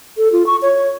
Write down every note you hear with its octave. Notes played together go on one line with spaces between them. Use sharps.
A4
F4
C#6
C#5